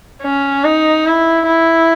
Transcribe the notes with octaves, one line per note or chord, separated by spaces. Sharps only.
C#4
D#4
E4
E4